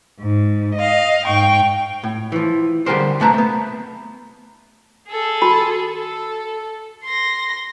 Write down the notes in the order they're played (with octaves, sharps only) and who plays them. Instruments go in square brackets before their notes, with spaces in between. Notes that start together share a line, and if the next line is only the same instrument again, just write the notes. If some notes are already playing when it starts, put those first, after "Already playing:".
[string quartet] G#2
D#5 F5
G#2 G5 C#6
[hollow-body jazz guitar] A2
E3 F3
D3 G3 G4 G#4 A#4 C5
G2 C3 A3 B4 A5 A#5
A3 B3
[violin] G#4 A4
[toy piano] F#4 B5
[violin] A4
C6 A#6